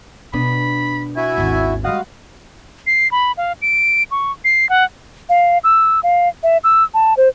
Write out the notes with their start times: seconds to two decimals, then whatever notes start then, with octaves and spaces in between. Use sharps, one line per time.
0.33 B2 B3 D4 B5
1.16 E4 F#4 E5 G#5
1.38 G#1 D#2 A6
1.84 G3 G#3 F#4 D#5 F5 F#5
2.87 C7
3.11 B5
3.38 F5
3.62 D7
4.11 C#6
4.44 C7
4.69 F#5
5.29 F5
5.64 E6
6.03 F5
6.43 E5
6.64 E6
6.94 A5
7.17 C5